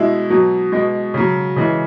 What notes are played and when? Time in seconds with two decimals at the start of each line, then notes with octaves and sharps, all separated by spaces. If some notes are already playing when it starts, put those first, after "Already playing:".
Already playing: B2 G#3 E4
0.30 B2 F#3
0.72 B2 G#3
1.14 C#3 F#3
1.56 C#3 E3 G#3